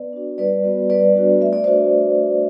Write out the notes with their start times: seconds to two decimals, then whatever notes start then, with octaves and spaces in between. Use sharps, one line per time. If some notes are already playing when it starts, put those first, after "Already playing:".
Already playing: B3 B4 D5
0.13 D4 F#4
0.38 G3 B4 D5
0.64 B3 F#4
0.90 G3 B4 D5
1.15 B3 D4 F#4
1.41 A3 E5
1.53 D5
1.64 D4 F#4 C5 E5